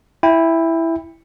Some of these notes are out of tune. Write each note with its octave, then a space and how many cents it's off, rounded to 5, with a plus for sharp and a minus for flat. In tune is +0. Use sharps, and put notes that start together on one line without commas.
E4 +0 G5 +25